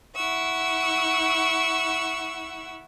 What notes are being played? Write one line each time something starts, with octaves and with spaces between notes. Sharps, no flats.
E4 F#5 C#6 E6